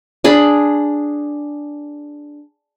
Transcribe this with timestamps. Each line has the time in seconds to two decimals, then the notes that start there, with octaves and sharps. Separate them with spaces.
0.24 D4 G#4 B5